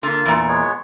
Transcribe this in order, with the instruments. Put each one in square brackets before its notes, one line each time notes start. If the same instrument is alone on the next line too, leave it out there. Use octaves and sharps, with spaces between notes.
[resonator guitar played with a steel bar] D3 [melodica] A#3 F4
[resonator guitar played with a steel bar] E2 A#2
[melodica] G#3 B3 C#5